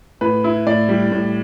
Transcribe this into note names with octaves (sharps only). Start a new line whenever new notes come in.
A2 B4
E4
A2 D5
G3
A2